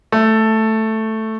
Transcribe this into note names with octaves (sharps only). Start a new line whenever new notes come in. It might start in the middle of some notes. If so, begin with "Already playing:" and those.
A3